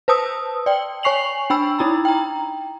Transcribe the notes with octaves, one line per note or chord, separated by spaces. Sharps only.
B4 C5 A5 D#6 E6
D5 G5
C#5 G#5 C#6 C7 F7 F#7
D4 G5 B5 E6
D#4 E4 A#5 B5
G5 A#5